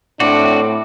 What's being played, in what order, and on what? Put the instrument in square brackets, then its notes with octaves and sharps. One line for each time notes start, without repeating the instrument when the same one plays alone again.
[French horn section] A2 [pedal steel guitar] C4 F#4 [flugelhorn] D4 [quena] D6